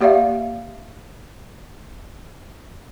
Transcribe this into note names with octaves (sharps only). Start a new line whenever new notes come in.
A#3 G4 D5 E5 F5